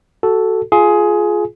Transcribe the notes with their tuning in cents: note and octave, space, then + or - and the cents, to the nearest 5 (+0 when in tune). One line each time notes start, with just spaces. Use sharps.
F#4 +20 A4 +0
F4 +0 G#4 +15